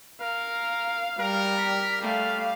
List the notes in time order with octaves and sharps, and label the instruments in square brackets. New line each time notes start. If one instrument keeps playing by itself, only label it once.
[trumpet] A#4 [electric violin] F5
[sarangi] G3 [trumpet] A#4
[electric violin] B6
[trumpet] G3 [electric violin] A3 [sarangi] F5